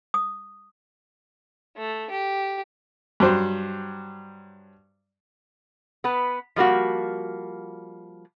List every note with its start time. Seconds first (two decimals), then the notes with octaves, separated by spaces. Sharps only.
0.14 D#6
1.77 A3
2.10 G4
3.20 G2 F#3 C5
6.04 B3 B4
6.56 F3 G3 A#3 F#4